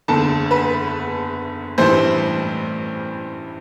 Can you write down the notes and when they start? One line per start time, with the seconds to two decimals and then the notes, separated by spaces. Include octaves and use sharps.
0.08 F#1 E2 D3 A4 A5
0.51 B3 B4
1.78 A1 G2 E3 G3 C4 C5